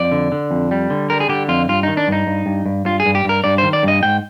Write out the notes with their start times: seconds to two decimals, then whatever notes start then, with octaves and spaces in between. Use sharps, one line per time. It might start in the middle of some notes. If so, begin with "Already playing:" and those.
Already playing: F2 D5
0.12 D3
0.32 D3
0.51 F2
0.71 G3
0.90 D3
1.10 G3 A#4
1.20 G#4
1.29 D3 G4
1.48 F2 F4
1.69 G2 F4
1.83 D#3 D#4
1.97 D4
2.08 G2 D#4
2.27 G2
2.46 G2
2.66 G2
2.86 G2 F4
3.00 G#4
3.06 G2
3.15 G4
3.24 G2 A#4
3.44 G2 D5
3.58 D#3 C5
3.73 D5
3.83 G2 D#5
4.03 G#2 G5